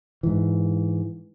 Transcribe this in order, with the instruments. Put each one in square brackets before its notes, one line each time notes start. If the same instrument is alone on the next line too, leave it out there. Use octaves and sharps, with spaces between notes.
[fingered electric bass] G#2 E3